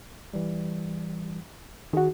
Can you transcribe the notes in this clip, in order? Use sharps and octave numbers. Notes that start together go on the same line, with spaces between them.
E3 G3
D#3 D#4 F#4 G#4